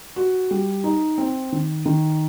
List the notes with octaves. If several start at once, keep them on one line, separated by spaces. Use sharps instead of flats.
F#4
G3
D#4
C4
D#3
D#3